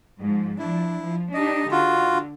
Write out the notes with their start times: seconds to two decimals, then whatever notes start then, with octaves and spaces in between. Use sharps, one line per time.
0.20 G#2 F3
0.59 F3 D4 E4
1.01 F3
1.34 D4 D#4 G4 D#5
1.71 D3 F4 F#4